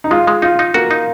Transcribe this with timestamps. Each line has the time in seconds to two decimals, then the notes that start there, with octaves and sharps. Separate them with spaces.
0.04 D#4
0.11 G#3 F4
0.27 G#3
0.42 D#4 F4
0.59 D#4
0.74 A#3 F#4
0.91 D#4